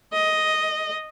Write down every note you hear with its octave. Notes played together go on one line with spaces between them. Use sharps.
D#5